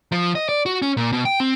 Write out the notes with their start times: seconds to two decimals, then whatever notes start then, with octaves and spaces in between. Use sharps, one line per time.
0.12 F3
0.35 D#5
0.49 D5
0.66 F#4
0.82 C#4
0.97 A#2
1.13 B2
1.25 G5
1.40 C4